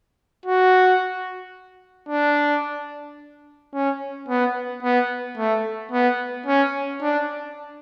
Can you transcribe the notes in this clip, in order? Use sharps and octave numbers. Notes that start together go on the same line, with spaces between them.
F#4
D4
C#4
B3
B3
A3
B3
C#4
D4